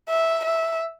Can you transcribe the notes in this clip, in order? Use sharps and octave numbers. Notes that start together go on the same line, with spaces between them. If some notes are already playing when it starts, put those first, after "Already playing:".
E5
E5